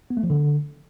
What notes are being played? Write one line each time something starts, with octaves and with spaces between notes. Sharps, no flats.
B3
A3
F3
D3